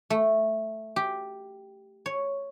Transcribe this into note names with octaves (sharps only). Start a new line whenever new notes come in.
A3
G4
C#5